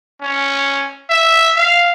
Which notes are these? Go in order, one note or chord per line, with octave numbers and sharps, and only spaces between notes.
C#4
E5
F5